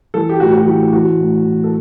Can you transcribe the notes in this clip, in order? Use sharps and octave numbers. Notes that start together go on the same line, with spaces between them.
E3 A4
G4
A2 F#4
F#4
E3 G4
E3 F#4
A2
E3
A4